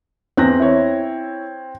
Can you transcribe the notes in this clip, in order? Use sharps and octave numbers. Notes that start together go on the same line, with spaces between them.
E2 C4 F#6 A#6
E4 C#5